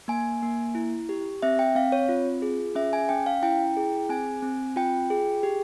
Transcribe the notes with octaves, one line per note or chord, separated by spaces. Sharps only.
A#3 G#5
A#3
E4
G4
C4 E5
G5
C4 F5
C#5
F4
G#4
C#4 E5
G#5
C#4 G5
F5
E4 G5
G#4
C4 G#5
C4
F4 G5
G#4
G4